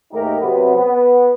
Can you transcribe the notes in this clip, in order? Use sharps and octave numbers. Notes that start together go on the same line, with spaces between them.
D#2 G#2 A3 D#4 G4 A#4
C3 F#3 B3
B3